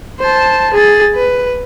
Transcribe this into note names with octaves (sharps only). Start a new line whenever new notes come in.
C5 A5
G#4 A6
B4